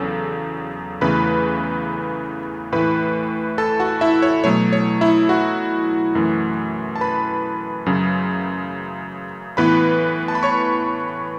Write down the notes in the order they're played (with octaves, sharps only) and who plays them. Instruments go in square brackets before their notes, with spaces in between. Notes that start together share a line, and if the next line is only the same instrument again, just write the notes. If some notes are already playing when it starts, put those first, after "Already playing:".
Already playing: [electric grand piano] E2 C#3 F#3 A4
E2 C#3 E3 A3 B4 B5
A2 E3 A3 B4 B5
A4 A5
F#4 F#5
E4 E5
C#5
B2 F#3 A3 C#5
C#5
E4 E5
F#4 F#5
F#2 E3 A3
A5
B4 B5
F#2 C#3 F#3
A2 E3 B3 B4 B5
A5
B5
C#5 C#6